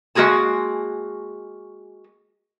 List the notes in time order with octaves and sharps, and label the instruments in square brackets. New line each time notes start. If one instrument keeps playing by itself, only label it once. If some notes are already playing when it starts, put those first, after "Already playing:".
[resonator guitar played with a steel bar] G#3 A#3 F#4 G#4 A5